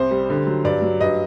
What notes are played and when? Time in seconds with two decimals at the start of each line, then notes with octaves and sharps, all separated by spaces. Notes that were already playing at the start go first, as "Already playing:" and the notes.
Already playing: C2 C5
0.11 G3
0.30 D3
0.47 F#3
0.64 G2 D5
0.82 F#3
1.01 G2 D#5